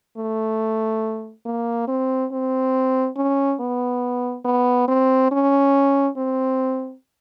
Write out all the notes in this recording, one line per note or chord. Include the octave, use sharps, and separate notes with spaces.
A3
A#3
C4
C4
C#4
B3
B3
C4
C#4
C4